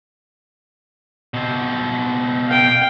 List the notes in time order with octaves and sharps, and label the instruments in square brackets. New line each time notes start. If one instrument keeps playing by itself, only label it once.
[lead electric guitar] B2 C4
[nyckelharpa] F5 G5